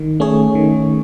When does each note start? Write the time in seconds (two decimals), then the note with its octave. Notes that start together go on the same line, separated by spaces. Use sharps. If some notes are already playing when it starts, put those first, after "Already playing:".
Already playing: D#3
0.20 A3 C#4 G#4 C#5
0.55 D#3